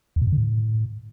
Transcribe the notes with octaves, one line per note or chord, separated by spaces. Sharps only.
E2
A#2
F#2
D3
A2